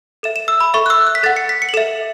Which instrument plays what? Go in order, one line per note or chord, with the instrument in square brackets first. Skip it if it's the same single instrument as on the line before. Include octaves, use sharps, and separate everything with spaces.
[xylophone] A4 E5 E7
E7
E6
B5
A4 E5 C#6
F#6
E6
F#6
B6
A4 F#5 A6
C#7
B6
C#7
F#7
A4 E5 E7